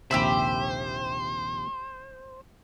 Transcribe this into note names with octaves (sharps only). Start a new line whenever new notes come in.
A#1 D#2 C3 G4 C5 E5 B5